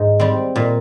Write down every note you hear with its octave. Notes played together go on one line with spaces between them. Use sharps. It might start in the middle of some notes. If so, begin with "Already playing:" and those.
Already playing: G#2
G3 C4
A#2